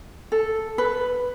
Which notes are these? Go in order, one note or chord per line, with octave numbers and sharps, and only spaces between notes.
A4
B4